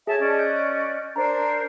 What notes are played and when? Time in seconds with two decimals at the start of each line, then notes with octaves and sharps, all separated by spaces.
0.07 G#4 C#5 E5 A5 G#6
0.20 C#4 D5 D#5
0.39 F#6 G6
1.16 D4 A#4 C5 A#5